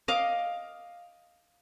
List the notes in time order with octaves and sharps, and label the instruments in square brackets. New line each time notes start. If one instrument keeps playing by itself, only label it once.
[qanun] D#5 F5 D6